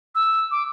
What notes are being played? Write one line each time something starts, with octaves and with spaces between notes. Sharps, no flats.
E6
D6